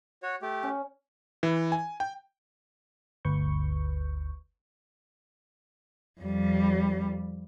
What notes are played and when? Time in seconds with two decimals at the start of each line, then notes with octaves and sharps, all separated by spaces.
0.23 F#4 C#5
0.42 A3 G4
0.63 C#4
1.43 E3
1.72 G#5
2.00 G5
3.25 G1 D2 B4 C#6 G6
6.21 F2 G3